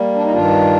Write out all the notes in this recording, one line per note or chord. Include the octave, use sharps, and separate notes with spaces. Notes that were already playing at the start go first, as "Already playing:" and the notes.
Already playing: G3 A#3
D4
D#4
G2 D#3 D4 F4